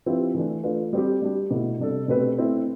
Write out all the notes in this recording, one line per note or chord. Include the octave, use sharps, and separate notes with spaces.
F3 C4 E4 G4 B4
E3 A3 D4
A3 D4 F4 B4
G3 C4 G4
G3 D4 G4
B2 A3 E4
C3 G3 D4 A4
B2 A3 C4 G4 B4
A3 C4 E4